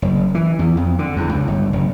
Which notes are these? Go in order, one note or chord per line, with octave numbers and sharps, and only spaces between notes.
F#1
E3
E2
F2
D3
E2
C#2
G1
F#1